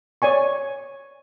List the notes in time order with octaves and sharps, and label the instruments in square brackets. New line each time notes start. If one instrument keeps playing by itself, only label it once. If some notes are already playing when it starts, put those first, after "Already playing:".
[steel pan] C#5 D5 G#5 C#6